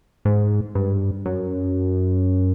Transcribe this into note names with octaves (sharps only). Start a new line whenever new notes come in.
G#2
G2
F#2